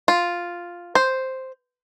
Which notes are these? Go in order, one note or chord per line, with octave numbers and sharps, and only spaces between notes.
F4
C5